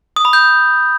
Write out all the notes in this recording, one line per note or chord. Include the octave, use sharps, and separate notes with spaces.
D#6
B5
G6